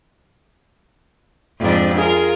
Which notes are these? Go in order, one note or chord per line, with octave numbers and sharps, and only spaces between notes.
F2 G#2 D4
F4 G#4 A#4